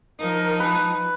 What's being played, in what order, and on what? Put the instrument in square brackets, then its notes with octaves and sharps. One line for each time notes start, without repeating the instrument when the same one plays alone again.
[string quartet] F3 D#4 [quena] A#4
[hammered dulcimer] B4 [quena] A5